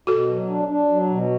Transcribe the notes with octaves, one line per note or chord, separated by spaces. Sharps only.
B2 F#4 A4
F#3
D4
D4
F#3
B2